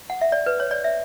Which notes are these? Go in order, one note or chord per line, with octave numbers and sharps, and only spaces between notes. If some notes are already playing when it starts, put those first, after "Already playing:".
F#5
E5
D5
B4
C#5
D5
E5